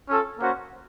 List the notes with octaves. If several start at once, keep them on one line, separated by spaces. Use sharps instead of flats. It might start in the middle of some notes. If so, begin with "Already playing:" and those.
C#4 F4 A4
A#3 C#4 F#4 C5 F#5